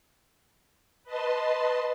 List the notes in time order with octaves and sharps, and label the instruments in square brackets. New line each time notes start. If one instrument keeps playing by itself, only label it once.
[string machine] B4 D#5 A5 C6